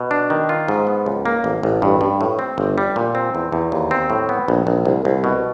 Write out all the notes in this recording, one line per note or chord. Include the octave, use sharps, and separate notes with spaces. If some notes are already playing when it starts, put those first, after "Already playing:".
Already playing: B2
D4
D#3
F4
G#2
B3
C#2
A#3
A1
A1
G2
G2
A2
C4
G1
G3
A#2
C4
E2
E2
D#2
C4
A2
B3
A#1
A#1
C2
C2
B2